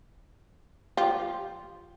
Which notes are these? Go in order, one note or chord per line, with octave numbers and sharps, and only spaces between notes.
F3 F4 G4